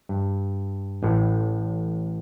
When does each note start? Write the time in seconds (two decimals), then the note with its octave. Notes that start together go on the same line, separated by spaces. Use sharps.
0.09 G2
1.03 A1 A2